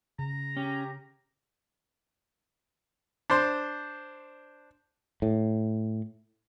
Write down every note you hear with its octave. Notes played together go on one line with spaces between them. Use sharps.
C#3 A#5
C#4 G4
D4 C5 C6
A2